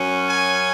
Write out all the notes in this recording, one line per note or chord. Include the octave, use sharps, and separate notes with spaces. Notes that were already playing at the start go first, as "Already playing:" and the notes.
Already playing: F#2 F#3 C#4
G#5